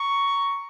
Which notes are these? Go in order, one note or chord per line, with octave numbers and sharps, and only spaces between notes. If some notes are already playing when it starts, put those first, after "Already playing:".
Already playing: A#5 C#6